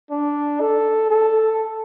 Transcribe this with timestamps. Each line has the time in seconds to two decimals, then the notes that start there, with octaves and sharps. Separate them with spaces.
0.10 D4
0.60 A4
1.10 A4